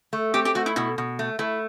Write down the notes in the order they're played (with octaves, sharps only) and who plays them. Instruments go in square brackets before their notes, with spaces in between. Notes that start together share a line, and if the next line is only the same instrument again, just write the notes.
[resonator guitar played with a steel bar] A3
[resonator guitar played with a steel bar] C4 [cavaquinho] G4
[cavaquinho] G4
[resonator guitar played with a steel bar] A3 [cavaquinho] F#4
[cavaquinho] E4
[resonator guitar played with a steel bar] B2 [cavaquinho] E4
[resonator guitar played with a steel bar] B2
A3
[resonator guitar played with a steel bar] A3 [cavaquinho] E4